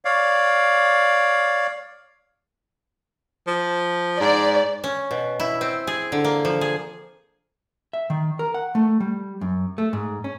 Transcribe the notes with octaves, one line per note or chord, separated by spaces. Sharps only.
C#5 D5 F5
F3
G#2 D5
C#4
B2
E4
C4
G#4
D3
A#3
F3
G#4
E5
D#3
A#4
F#5
A3
G3
F#2
A3
G#2
C#4